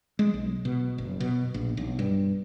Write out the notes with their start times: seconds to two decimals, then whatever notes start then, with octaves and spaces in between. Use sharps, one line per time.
0.19 G#3
0.34 B1
0.65 B2
0.98 F#1
1.20 B2
1.54 A#1
1.77 B1
1.99 G2